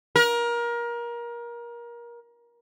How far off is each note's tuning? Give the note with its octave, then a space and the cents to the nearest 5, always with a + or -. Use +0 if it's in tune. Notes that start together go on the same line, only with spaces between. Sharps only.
A#4 +25